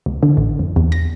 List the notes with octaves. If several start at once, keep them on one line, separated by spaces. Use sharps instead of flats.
C#2
D3
A1
F2
E2
A#6